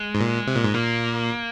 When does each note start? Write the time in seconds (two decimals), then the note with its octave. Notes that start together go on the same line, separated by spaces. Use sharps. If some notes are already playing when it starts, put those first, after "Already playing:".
Already playing: G#3
0.15 G#2
0.20 A#2
0.47 C3
0.56 A#2
0.64 G#2
0.73 A#2 A#3